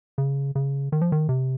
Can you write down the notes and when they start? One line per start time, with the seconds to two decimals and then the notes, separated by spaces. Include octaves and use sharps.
0.18 C#3
0.55 C#3
0.92 D#3
1.01 F3
1.12 D#3
1.29 C3